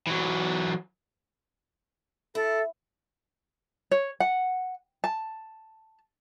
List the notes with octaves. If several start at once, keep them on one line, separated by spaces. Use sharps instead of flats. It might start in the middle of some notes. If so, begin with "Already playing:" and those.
E3 F#3
E4 A4
C#5
F#5
A5